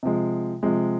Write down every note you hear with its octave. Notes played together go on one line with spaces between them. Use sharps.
C3 F3 G#3
C3 F3 G#3